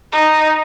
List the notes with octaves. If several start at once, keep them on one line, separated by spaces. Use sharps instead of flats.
D#4